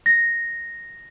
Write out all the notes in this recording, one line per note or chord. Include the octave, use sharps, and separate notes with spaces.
A#6